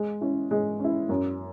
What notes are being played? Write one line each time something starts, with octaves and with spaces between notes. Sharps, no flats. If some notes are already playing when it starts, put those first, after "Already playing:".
Already playing: G#3
C#4 E4
G#3
C#4 E4
F#2